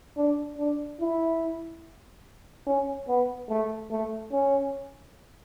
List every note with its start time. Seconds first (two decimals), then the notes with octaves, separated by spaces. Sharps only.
0.17 D4
0.58 D4
1.00 E4
2.67 C#4
3.08 B3
3.49 A3
3.91 A3
4.32 C#4